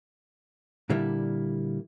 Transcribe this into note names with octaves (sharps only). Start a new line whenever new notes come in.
A#2 D3 G3 A#3 E4